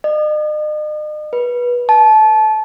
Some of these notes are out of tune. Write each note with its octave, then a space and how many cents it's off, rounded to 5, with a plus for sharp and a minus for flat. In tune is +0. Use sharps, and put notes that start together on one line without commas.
D#5 -45
B4 -25
A5 -25